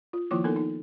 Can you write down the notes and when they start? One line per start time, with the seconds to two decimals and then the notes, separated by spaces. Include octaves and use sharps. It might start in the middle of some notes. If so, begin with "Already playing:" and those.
0.13 F4
0.31 D#3 F3 A#3 E4 F4 D6
0.44 A#3 B3 D#4 A4 A#4
0.56 D#4